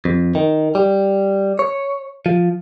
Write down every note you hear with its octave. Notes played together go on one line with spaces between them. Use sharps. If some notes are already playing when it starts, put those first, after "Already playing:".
F2
D#3
G3
C#5
F3